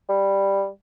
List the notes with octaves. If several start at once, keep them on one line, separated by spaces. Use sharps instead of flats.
G3